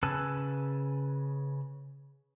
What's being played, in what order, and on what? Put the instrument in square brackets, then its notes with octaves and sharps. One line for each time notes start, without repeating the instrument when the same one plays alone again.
[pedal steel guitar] C#3 B4 G#5 A5 E6